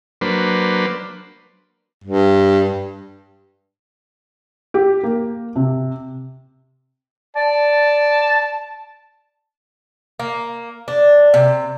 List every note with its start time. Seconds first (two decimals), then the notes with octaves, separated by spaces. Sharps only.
0.21 F#3 A#3 D4 B4 C5
2.04 G2
4.74 G4
5.03 A#3
5.56 C3
7.36 D5 A5
10.20 A#3
10.88 D4
11.34 C3